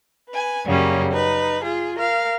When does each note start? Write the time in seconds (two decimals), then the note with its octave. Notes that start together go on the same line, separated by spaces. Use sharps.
0.29 B4 G#5
0.67 F#2 C#3 G3 A#3 C#4
1.10 D#4 B4
1.64 F4 G#4
1.98 A#4 F5